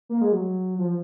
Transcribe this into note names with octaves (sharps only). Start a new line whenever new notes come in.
A#3
G#3
F#3
F3